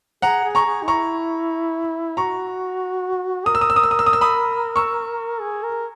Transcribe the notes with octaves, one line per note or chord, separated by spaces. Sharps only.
G#4 F#5 A#5
G#4
A#5 C#6
G#4
D#4
E4 A#5 C#6
F#4 A#5 C#6
A#4 D#6
E6
D#6
E6
D#6
E6
D#6
E6
D#6
E6
B5 D#6
C#6 E6
G#4
A#4